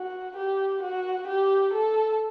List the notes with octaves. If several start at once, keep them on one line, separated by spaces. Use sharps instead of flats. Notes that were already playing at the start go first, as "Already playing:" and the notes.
Already playing: F#4
G4
F#4
G4
A4